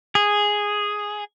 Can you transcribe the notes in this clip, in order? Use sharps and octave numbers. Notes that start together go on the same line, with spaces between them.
G#4